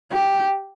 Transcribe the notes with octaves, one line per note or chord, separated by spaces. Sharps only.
G4